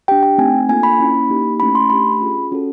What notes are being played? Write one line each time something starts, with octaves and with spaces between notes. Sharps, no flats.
D4 G4 G5
G5
A3 C4 D#4 G#5
A#3 D4 F4 A4 G#5
B5
A#3 C#4 E4
A#3 D#4 G4
A3 C#4 E4 B5
C6
A3 D4 G4 B5
C#4 F4 G#4
C#4 F#4 A4